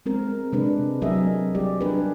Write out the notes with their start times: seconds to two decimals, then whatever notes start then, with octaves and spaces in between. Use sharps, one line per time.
0.06 G#3 C4 A#4
0.52 C3 G#3 D4 B4
1.02 F#3 C4 G#4 A#4 D#5 E5
1.55 G3 G4 D5
1.81 D4 G#4 A#4 B4